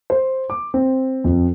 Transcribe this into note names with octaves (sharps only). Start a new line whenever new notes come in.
C5
D6
C4
F2